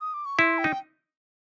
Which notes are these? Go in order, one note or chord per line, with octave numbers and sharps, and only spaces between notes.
D#6
D6
C#6
E4 C6
G5
D#4